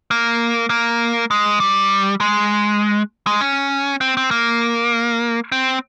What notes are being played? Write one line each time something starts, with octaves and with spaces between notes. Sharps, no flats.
A#3
A#3
G#3
G3
G#3
G#3
C#4
C4
C4
A#3
C4